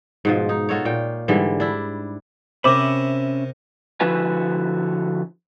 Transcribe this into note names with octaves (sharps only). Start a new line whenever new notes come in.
G#2 B2 F3
D#4
F4 F#4 A4 C#5
A#2 G5
G#2 D3 E3 G3
D4 E4
C3 C#4 A#4 C5 E5 B5 D6
D3 F3 E4 F#4 B4 G#5